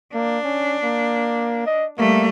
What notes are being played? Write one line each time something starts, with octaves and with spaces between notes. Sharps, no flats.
A#3 D4
C#4
A#3
D#5
G3 A3 A#3